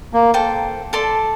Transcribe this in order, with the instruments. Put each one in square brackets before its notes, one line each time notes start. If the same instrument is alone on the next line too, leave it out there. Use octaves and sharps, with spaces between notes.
[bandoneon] A#3
[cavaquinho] A4 C5 G5
A4 D5 A5 C6